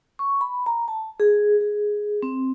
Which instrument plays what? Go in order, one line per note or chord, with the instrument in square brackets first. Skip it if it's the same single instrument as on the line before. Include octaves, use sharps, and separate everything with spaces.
[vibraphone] C#6
B5
A#5
A5
G#4
G#4
C4